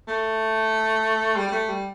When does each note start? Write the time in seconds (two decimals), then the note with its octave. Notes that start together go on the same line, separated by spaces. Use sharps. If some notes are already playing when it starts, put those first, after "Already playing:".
0.08 A3
1.37 G3
1.49 G3
1.52 A3
1.68 G3